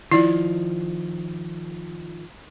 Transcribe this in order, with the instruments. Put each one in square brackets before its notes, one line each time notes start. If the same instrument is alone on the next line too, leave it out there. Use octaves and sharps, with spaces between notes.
[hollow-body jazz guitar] D#3 F3 [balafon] E4 D5